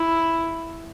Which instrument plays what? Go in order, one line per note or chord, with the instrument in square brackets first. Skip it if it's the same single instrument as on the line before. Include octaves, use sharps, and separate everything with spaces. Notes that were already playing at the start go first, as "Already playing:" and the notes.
Already playing: [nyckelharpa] E4